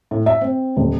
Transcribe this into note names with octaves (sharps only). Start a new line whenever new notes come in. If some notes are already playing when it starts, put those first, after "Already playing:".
A2
E5
C4
D#1